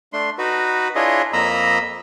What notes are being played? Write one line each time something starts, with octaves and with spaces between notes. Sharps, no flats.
A3 D4 C6
D#4 F#4 B4
D4 E4 F4 G#4 C#5 D#5
F2 A#3 D#5 A#5 B5 E6